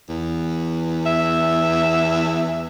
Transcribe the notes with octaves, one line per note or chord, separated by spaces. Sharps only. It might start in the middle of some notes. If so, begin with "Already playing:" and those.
E2
E5